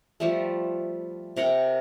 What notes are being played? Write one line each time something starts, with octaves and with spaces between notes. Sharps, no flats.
F3 G3 A3
C3 A#4 F#5 G5